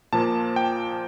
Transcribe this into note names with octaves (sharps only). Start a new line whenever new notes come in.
A#2 F3 A#3 A5
G5